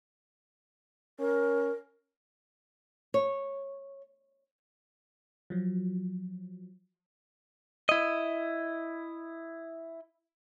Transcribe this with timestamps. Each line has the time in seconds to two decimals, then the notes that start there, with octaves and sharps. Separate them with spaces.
1.20 C#4 A#4
3.14 C#5
5.50 F3 F#3
7.89 E4 D#5